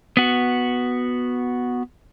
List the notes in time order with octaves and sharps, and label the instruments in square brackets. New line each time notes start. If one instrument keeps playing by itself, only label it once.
[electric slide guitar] B3 F#4